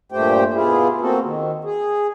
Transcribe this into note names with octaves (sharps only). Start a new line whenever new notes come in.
G2 A#2 A3 G4 C5 G5
B2 E4 F4 G#4
A#3 C4 F#4 A4
D#3
G#4